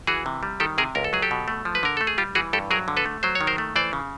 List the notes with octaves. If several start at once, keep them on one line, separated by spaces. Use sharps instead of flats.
E3 F#4 G#4
C3
G3
D#3 G4 A4
C3 G#4 A#4
C#2 A#4
A4
F#3 G#4
G4 A4
B2
A3
F3
B4
D3 A#4
A3 A4
G#4
G3 F4 G4
E3 F#4 G#4
G2 G4 A4
F#3 G#4 A#4
D3
A4 B4
A3
F#3 C5
C#5
D#3
A#4 C5
A3
E3 C5 D5
C#3